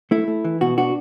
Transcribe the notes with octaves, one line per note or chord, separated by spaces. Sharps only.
A3 E4
A3
E3
B2 F#4
D4 F#4